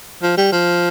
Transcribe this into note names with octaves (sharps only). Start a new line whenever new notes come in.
F3
G3
F3